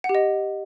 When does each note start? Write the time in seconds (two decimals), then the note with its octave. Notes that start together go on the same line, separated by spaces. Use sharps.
0.04 F#5
0.09 G4
0.15 D#5